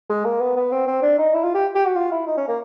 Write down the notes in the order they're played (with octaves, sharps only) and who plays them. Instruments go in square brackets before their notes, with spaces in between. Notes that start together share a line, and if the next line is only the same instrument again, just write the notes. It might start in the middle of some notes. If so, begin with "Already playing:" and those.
[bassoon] G#3
A#3
B3
B3
C4
C4
D4
D#4
E4
F4
G4
G4
F#4
F4
E4
D#4
C#4
A#3